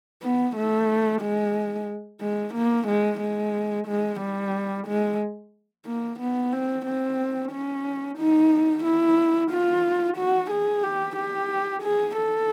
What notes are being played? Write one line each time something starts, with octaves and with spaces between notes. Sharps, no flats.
B3
A3
G#3
G#3
A#3
G#3
G#3
G#3
G3
G#3
A#3
B3
C4
C4
C#4
D#4
E4
F4
F#4
G#4
G4
G4
G#4
A4